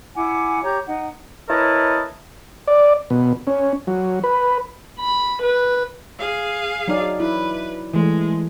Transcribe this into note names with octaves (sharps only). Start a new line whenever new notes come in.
E4 F#5 G#5 D6
G4 C#5 A#5 G6
D#4 F#5
E4 A#4 B4 C#5 D#5 A5
D5
B2
C#4
F#3
B4
B5
B4
G#4 F5
F#3 D#4 D5
E4 B4
E3 G#3 A3